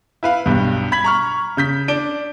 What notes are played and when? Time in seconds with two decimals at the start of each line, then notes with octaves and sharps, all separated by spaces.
0.23 E4 B4 F5
0.46 B1 G2
0.92 B5 G#6 B6 F#7
1.04 A#5 C#6 F6
1.57 C#3 G6 B6
1.88 D4 D7 G7